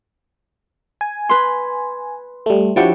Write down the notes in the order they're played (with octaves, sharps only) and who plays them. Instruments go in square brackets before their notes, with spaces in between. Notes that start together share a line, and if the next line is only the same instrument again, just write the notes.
[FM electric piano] G#5
[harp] B4 C6
[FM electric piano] G3 A3
[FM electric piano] F3 E4 F#4 [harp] D4 G4 C#5